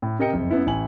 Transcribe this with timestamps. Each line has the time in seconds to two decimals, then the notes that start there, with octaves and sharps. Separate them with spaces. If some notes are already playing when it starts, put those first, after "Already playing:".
0.02 A2
0.19 C3 A#4 D#5 G5 C#7
0.33 F#1 F2
0.51 F#2 B3 E4
0.66 A1 E4 G#5 F#7